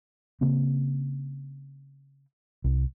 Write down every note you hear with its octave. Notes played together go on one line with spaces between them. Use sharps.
C#3 A#3 C4
C2